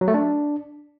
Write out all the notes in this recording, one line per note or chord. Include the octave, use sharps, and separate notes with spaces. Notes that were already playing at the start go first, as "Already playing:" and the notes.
F#3
A3
D4